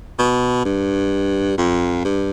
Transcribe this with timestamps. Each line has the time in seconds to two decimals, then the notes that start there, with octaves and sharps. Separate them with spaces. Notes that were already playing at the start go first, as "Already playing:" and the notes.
0.19 B2
0.65 G2
1.57 F2
2.05 G2